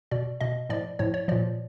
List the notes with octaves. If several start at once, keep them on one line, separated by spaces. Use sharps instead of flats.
B2 D5
B2 D#5
A2 F3 D5
A2 F3 C#5
C#5
A#2 F3 D5